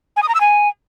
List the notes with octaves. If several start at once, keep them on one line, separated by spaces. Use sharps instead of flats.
G#5
D#6
A#5
E6
G#5